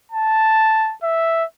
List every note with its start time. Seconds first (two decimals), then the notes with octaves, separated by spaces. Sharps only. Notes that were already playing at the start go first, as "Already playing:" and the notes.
0.12 A5
1.03 E5